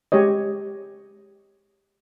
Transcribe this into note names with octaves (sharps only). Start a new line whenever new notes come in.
G#3 G4 C#5 D#5